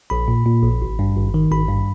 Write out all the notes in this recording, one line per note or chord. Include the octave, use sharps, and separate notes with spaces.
A#1 B5
A#2
A#2
A#1
G#1
G2
G#1
D#3
G#1 B5
G2